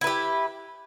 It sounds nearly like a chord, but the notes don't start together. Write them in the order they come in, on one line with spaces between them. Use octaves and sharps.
E4 B4 G4